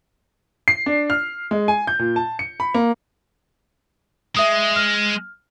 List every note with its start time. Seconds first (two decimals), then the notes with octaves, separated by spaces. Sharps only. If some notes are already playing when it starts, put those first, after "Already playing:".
0.68 C7
0.86 D4
1.10 F6
1.51 G#3
1.68 G#5
1.87 G6
1.99 A#2
2.16 A5
2.39 C#7
2.60 B5
2.74 A#3
4.37 G#3 E5 D#6
4.76 F6